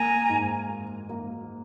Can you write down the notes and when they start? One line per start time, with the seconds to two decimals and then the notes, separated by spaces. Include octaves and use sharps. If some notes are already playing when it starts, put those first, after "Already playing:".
Already playing: A#3 G#5 A#5
0.29 G#2
0.69 A#3
1.09 A#3